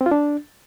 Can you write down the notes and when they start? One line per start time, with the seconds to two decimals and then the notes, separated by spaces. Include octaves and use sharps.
0.01 C4
0.06 F4
0.11 D4